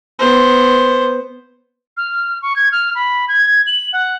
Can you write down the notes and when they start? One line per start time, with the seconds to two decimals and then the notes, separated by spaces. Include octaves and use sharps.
0.19 B3 C5
1.97 F6
2.42 C#6
2.56 G#6
2.72 F6
2.95 B5
3.28 G#6
3.67 F#7
3.93 F#5